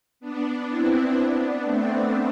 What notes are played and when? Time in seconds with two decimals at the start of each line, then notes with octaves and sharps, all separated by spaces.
0.20 B3 D4
0.67 C4 E4
1.16 B3 D4
1.63 A3 C4